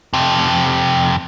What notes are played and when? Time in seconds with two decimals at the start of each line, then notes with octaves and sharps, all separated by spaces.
0.13 F2 C3